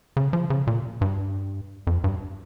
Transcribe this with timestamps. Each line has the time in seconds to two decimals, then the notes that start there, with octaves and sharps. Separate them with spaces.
0.17 C#3
0.33 F3
0.50 C#3
0.67 A#2
1.01 G2
1.87 F2
2.04 G2